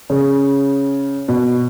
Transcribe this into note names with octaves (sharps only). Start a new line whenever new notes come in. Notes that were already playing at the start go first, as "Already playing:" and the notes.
C#3
B2